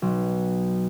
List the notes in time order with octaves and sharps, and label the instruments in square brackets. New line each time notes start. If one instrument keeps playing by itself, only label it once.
[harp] B1